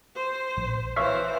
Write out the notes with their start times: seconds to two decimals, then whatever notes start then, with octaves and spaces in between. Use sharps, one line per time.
0.15 C5
0.57 A#1
0.96 E3 C5 C#5 E5 F5